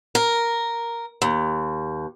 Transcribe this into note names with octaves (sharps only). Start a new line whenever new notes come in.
A#4
D#2